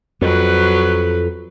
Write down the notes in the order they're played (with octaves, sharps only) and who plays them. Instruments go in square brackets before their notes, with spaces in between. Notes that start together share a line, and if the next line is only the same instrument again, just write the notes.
[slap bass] F2 [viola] F#3 B4